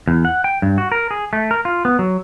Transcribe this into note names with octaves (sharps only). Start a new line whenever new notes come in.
E2
F#5
G5
G2
F#4
A#4
G#4
A3
A#4
F4
B3
F#3